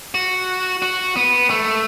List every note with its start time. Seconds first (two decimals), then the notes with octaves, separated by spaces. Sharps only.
0.15 F#4
0.82 F#4
1.16 B3
1.50 A3